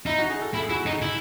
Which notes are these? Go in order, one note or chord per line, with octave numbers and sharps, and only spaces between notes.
D#4 E4
F#4
G#4
A4
E4 A4
G#4
E4 F#4
D#4 G#4
E4